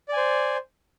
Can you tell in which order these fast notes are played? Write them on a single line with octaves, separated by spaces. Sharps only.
D5 G#5 C5